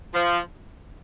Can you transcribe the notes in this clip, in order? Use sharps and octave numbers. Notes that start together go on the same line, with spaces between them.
F3